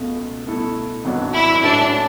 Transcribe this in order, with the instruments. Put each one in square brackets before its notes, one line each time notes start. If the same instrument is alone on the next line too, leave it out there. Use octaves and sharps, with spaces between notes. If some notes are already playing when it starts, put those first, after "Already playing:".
Already playing: [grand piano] C#2 B2 A3
B2 A3 E4 A4
G#1 G#2 F#3 B3 D4
[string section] E4
[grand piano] A2 G#3 C#4 F#4 B4 [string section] D4